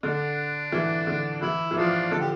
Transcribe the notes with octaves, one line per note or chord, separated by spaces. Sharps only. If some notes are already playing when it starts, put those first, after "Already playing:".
D3 D4
E3
D3
E3 E4
E3
F3 D4 F4
D3 A4
G4